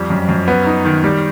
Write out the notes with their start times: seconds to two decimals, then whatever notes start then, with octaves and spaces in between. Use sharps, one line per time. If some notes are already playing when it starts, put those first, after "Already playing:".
Already playing: F2 G3
0.10 F#2
0.29 F#2
0.48 B3
0.66 D#4
0.85 D#3
1.04 G3